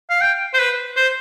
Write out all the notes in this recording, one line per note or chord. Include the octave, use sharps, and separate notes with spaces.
F5
G5
C5
B4
C5